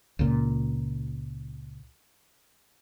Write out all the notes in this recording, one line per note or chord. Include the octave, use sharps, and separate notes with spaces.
C#2 A#2